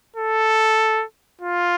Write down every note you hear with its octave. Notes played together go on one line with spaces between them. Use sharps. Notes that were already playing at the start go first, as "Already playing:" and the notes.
A4
F4